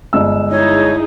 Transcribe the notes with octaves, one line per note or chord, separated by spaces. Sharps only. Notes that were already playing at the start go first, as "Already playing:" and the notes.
G1 G#3 E6
D#4 E4 G#4 C#5